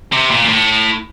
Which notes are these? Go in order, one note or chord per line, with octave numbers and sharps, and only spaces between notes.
C3
A#2
A#2
A2